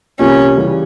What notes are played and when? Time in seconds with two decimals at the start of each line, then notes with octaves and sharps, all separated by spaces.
0.19 C2 C3 F3 A#3 C#4
0.57 C#3 E3 G3